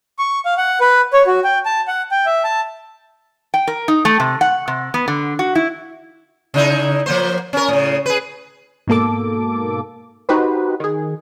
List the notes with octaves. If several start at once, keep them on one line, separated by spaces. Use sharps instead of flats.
C#6
F5
F#5
B4
C#5
F#4
G5
A5
F#5
G5
E5
A5
G5
A#4
D#4
A3
C3
F#5
C3
B3
D3
F#4
E4
C#3 D#4 E4
F3 A#3 C5
C#4 A#4
A2 C#3
G#4 B4
G#2 B2 A#3 A4 D6
D#4 F#4 G4 B4 C5
D#3 G#4